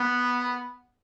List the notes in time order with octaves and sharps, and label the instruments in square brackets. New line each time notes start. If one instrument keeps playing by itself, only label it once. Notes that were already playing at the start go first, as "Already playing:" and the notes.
Already playing: [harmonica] B3